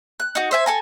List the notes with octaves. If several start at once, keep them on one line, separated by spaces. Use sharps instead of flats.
F#6
D#4 F#4
C5 E5 G#5
A4 G#5 A#5